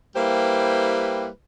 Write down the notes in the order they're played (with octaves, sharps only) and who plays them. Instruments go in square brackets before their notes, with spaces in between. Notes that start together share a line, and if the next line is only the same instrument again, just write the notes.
[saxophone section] G3 A#3 E4 G4 B4 C5